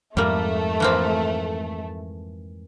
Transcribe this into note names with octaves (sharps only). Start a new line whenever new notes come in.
F2 G#2 G3 A3 A#3
E3 A#3 C4